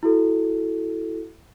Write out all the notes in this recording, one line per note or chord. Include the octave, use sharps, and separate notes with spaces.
E4 F#4 A4